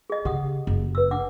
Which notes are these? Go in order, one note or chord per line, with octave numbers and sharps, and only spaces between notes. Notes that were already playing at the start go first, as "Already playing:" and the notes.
G#4 D#5
C#3 G4 F#5 D#6
F#1
B4 E6
D4 F#5 D6